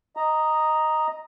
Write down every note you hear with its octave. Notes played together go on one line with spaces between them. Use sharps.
D#5 A#5